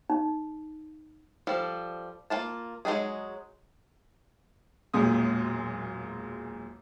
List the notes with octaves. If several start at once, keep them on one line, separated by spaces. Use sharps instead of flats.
D#4
F3 G3 A4
A#3 F4 A5
F#3 G#3 A#3 D#4 G#4
E1 F#2 A#2 G#3 D#6